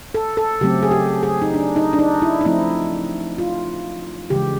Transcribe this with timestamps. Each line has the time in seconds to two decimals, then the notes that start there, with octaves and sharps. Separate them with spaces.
0.14 A4
0.37 A4
0.61 C#3 F#3 A3 C4 G4
0.83 G#4
0.91 G4
1.23 G#4
1.42 D#4
1.54 D4
1.76 D#4
1.93 D4
1.99 D#4
2.22 E4
2.41 D#4
2.45 F3 A3 C4 E4
3.38 F4
4.30 C#3 E3 G#3 G4